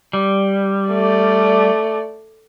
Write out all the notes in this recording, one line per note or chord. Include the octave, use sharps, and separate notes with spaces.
G3
A3 D5